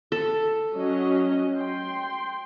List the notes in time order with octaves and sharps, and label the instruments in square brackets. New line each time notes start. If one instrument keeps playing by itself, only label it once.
[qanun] A4
[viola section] F#3 C#4 D#5
G5 C6